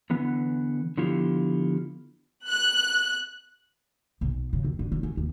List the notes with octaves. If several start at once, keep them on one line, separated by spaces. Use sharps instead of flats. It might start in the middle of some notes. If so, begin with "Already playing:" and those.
D3 E3 B3
D3 F3 B3 E4 F4 G4
F#6
B1
C#3
F2
D3
G#2
C#4
D#2